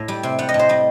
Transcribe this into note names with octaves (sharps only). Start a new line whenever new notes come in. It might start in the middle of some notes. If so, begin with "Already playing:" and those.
Already playing: A2
G3
C3
G3 F#5
D#5
A2
C5
G3 D#5